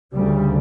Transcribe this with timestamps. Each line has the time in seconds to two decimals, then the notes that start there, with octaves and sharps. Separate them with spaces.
0.12 D2 C#3 G3